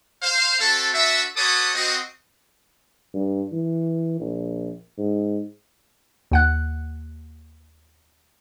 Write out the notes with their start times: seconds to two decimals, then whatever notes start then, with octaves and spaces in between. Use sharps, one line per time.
0.22 C5 F5
0.60 A3 C4 F#4 A4
0.94 D4 F#4 B4 E5
1.37 F#4 A4 B4 C#5 D6 D#6
1.75 C4 F#4 D#5
3.14 G2
3.52 E3
4.20 A#1
4.97 G#2
6.31 D#2 F#5 F#6